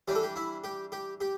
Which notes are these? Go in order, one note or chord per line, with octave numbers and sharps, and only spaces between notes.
E3 G3 D4 G4
A4
G4
E4
G4
G4
G4